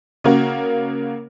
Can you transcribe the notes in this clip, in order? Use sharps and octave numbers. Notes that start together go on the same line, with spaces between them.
C#3 A#3 F#4